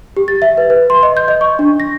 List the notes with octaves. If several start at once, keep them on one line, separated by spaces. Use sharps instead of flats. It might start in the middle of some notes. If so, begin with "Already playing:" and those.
G4
A6
E5
B4
B4
C6
D#5
G6
D#5
C#6
D4
A#6